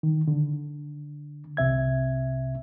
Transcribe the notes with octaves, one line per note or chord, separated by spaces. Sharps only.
D#3
D3
C2 C3 E5 G#6